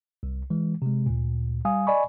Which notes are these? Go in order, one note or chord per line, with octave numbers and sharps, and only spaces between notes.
C2
E3 G#3
C3 G#3
D2 A#2
G3 F5 G#5 D#6
D5 D#5 G#5 B5 C#6